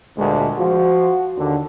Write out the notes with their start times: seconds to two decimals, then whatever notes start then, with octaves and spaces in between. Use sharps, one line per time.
0.18 D2 A#2 G#3 A4
0.57 F3 F#4
1.37 D#2 D3